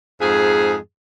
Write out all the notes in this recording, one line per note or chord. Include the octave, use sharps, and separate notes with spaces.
F2 G#2 G#4